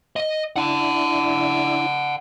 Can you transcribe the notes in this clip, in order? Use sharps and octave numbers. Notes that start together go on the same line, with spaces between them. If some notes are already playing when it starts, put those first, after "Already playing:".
D#5
D4 E4 F#5 A5